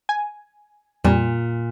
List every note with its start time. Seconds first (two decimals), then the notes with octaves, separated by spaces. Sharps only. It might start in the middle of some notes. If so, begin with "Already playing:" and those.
0.09 G#5
1.04 F2 A#2 G3